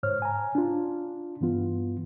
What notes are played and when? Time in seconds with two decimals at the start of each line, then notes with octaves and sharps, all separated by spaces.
0.03 G#2 C5 C#5 F6
0.22 G#5 A#5
0.55 D4 F4
1.41 G2 E3 B3 F4